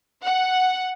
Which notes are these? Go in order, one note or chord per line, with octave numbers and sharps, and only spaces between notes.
F#5